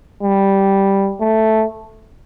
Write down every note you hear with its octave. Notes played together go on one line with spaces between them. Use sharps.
G3
A3